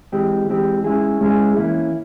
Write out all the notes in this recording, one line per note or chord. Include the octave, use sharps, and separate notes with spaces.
E3 G#3 C4 G4
E3 G#3 C4 G4
G#3 C#4 E4 G#4
G#3 C#4 E4 G#4
E3 A#3 C#4 E4